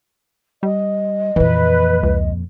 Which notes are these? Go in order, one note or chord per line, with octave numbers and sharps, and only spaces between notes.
G3 D#5
F2 A#2 E3 B4
C#2